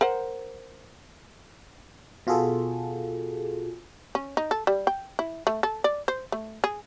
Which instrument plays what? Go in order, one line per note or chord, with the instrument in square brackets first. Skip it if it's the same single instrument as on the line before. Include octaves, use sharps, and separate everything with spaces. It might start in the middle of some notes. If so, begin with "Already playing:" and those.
[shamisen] A#4 C5 F#5
[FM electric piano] B2 F4 F#4 G#4 A4
[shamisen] C#4
D#4
A4
G3
G5
E4
A3
A4
D5
C5
A3
G#4